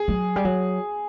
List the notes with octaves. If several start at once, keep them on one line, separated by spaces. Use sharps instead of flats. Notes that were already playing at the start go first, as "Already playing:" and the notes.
Already playing: G#4
F#3
G3
F#3